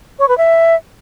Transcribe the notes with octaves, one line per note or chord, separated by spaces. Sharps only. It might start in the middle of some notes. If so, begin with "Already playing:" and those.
C#5
B4
E5